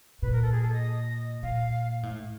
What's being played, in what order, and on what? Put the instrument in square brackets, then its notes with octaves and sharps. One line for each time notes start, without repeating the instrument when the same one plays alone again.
[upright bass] A#2 [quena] B4
[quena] A#4
A4
G#4
A4
D#5
[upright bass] A#2 [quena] F5
[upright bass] A2